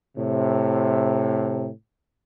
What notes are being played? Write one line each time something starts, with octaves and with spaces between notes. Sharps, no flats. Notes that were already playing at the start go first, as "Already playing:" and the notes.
A2 C3